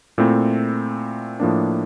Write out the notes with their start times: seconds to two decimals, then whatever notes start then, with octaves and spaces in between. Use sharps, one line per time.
0.18 A#2 A3 C4 E4
1.40 A2 F3 A#3 D4